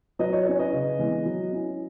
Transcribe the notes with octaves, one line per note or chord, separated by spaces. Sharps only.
F#3 B4 D#5
C#5
C#4 E4 C#5
B4 D#5
C#3
E3 G#3 B3
F#3
C#4 E4